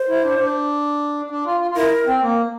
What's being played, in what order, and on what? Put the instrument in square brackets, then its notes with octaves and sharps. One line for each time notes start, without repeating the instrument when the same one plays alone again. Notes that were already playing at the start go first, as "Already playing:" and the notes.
Already playing: [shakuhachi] C5
[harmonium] E4
D4
D4
D4
F4
F4
F4
[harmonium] E4 [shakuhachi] A#4
[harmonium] C4
A#3